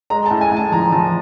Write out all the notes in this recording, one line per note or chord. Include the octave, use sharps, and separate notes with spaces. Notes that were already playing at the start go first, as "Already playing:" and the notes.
G#3 A#5
A5
A2
G#5
A2 A5
F3 A#5
F3 A5